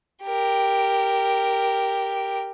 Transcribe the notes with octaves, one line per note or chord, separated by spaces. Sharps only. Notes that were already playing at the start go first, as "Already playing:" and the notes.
G4 A#4